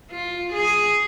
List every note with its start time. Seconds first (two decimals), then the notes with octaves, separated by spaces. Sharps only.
0.10 F4
0.53 G#4